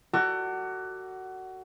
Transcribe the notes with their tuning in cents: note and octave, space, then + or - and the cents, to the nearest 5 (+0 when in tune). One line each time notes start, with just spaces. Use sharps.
F#4 +20 A4 +40 D5 +0